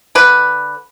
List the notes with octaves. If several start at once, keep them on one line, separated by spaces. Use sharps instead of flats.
D3 B4